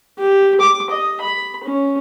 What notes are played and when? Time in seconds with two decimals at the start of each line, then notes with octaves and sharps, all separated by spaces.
0.18 G4
0.61 D6
0.90 D#5
1.21 B5
1.64 C#4